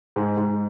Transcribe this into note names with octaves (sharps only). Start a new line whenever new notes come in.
G#2
G#2